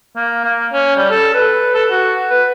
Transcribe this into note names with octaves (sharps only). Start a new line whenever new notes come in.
A#3
A#3
C#4
G3
A4
B4
A4
F#4
B4